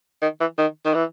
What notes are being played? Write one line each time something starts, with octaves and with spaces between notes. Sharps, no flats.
D#3
E3
D#3
D#3
E3